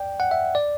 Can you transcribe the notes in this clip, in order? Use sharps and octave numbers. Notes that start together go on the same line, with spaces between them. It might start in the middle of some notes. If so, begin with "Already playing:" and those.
Already playing: D5 G5
F#5
E5
D5